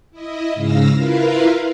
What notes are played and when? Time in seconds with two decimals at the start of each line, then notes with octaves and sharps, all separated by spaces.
0.11 E4 D#5
0.54 G#2 C#3 F5 E6 A#6
0.94 E4 F4 A#4 B4 F5